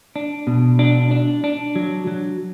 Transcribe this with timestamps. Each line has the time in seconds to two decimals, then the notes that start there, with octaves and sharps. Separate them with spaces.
0.16 D4
0.47 B2
0.79 D4
1.11 D4
1.44 D4
1.76 F#3
2.07 F#3